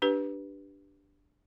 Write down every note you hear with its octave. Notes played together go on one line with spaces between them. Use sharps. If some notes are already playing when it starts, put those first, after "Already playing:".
D4 G4 B4